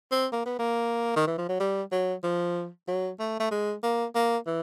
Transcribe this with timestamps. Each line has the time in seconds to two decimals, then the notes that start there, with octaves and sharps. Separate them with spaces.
0.12 C4
0.33 A#3
0.46 B3
0.59 A#3
1.16 D#3
1.27 E3
1.38 F3
1.49 F#3
1.60 G3
1.92 F#3
2.24 F3
2.88 F#3
3.20 A3
3.40 A3
3.51 G#3
3.83 A#3
4.15 A#3
4.47 E3